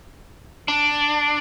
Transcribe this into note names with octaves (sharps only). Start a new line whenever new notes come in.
D4